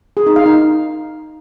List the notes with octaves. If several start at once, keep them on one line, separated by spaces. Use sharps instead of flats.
G#4
D#4
F5
D#4